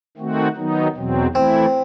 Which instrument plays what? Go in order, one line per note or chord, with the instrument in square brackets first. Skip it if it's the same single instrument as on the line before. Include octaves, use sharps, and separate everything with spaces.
[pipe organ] D#3 A3 C4 F#4
D#3 F#3 B3 D#4
E2 B2 F#3 C4
[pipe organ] E3 A3 E4 [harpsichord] C4